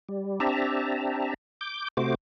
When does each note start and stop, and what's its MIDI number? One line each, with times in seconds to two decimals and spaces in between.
0.09 0.39 55
0.40 1.34 60
0.40 1.34 62
0.40 1.34 67
0.40 1.34 76
0.40 1.34 81
0.40 1.34 82
1.61 1.88 86
1.61 1.88 91
1.97 2.15 48
1.97 2.15 57
1.97 2.15 66
1.97 2.15 72
1.97 2.15 86